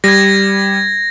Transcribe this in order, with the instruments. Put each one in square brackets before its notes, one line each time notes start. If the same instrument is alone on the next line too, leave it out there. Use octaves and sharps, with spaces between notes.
[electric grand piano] G3 [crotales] G#6 A#6